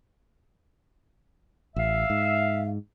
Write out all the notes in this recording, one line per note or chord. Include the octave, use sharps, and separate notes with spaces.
A1 E5 F5
G#2